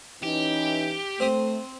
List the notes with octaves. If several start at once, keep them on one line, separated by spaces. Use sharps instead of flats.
E3 C#4 D#4 G4
A3 C4 C5 D#6